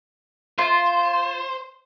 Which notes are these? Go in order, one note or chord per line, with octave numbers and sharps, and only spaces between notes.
F4 C5